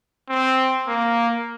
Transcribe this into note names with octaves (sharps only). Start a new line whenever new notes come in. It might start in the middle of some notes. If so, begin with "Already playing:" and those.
C4
A#3